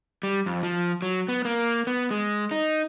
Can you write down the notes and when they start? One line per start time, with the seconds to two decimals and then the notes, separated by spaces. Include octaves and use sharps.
0.23 G3
0.46 F2
0.63 F3
1.02 F#3
1.28 B3
1.45 A#3
1.87 B3
2.11 G#3
2.51 D#4